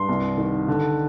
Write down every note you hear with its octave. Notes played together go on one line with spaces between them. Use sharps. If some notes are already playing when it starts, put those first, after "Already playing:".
Already playing: G2 C6
C2
D#3
D3